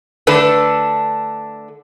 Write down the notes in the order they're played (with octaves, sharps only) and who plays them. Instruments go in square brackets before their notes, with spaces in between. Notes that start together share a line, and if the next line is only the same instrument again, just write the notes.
[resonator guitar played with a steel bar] D3 A3 D4 A4 B4